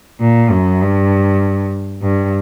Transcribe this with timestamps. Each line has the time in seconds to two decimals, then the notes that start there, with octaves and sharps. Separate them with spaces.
0.21 A#2
0.51 F#2
0.81 G2
2.02 G2